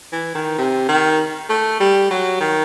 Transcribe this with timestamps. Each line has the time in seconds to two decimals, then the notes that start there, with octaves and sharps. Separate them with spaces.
0.13 E3
0.35 D#3
0.58 C3
0.89 D#3
1.49 A3
1.80 G3
2.11 F#3
2.40 D#3